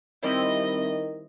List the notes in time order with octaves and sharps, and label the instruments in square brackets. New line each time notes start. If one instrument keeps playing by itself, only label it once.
[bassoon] D#3 [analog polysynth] G3 C4 E4 [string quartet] D#5